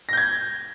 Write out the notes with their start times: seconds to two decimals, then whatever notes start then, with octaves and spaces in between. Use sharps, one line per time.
0.09 A#6
0.13 G6
0.17 G#6